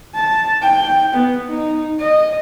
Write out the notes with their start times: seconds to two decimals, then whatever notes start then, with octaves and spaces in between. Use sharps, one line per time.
0.14 A5
0.62 G5
1.13 B3
1.49 D#4
1.99 D#5